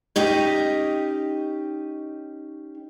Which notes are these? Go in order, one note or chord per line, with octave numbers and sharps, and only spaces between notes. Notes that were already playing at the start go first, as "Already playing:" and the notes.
C#4 D#4 G4 D#5